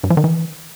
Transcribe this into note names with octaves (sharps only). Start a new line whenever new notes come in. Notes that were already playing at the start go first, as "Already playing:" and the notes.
G2
F3
D#3
E3